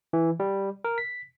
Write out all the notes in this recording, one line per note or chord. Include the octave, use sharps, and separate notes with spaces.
E3
G3
A#4
B6